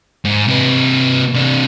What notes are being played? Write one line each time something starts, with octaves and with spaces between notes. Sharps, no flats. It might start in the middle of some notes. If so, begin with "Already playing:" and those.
G#2
C3 B4
C3 D4